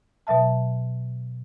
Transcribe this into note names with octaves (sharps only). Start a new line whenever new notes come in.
B2 F#3 E5 A5